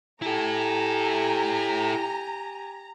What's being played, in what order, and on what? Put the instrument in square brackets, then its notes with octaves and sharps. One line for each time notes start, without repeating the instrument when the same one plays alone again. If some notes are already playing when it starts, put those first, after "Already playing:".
[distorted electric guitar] E4 A4 [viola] G4 G#5 [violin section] A#5